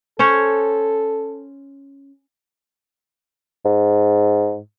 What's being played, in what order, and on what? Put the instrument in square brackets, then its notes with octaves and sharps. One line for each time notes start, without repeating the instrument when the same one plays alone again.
[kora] C#4 C5 C#5 [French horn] A4
[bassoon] G#2